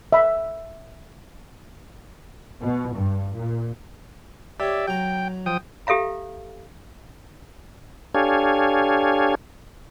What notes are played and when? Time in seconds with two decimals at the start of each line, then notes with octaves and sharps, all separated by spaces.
0.12 E5 B5
2.61 B2
2.94 G2
3.34 A#2
4.60 G4 C#5 D5 E5
4.87 F#3 G5 A#5
5.46 F3 G5 D#6
5.87 G4 A4 E5 F5 A#5
8.14 D4 G4 A4 C#5 F5 G#5